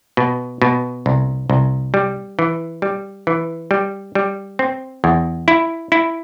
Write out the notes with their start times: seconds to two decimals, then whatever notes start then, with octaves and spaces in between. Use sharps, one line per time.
0.17 B2
0.62 B2
1.06 C2
1.50 C2
1.94 G3
2.39 E3
2.82 G3
3.27 E3
3.71 G3
4.15 G3
4.59 C4
5.04 E2
5.48 E4
5.92 E4